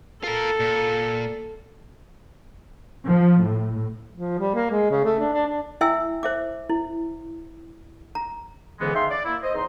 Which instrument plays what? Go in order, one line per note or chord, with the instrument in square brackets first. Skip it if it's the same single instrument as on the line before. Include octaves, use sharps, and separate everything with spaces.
[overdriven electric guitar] F4 A#4 [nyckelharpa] A4
[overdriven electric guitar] A#2
[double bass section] F3
A2
[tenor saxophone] F3
G3
A#3
G#3
C#3
A3
D4
D4
D4
[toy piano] E4 E5 G5 G#5 E6
C5 E5 D6
E4
A#5
[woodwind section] C#2 G#2 D3 E3 G#3 B3
D#4 G#4 E5 F5 G5 C6
D5
A#3 E4
C5 D#5
E2 D#4 C6